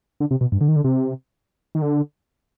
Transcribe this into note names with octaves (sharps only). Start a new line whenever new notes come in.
D3
C3
B2
G2
D3
D#3
D3
C3
D#3
D3